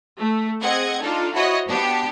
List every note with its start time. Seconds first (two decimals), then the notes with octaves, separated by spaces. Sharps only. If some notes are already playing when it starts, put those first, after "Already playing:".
0.19 A3
0.61 C4 G#4 D#5 F#5 G#6
1.02 D4 D#4 F4 A4
1.33 E4 F#4 C5 C#5 D#5
1.67 B3 D4 G4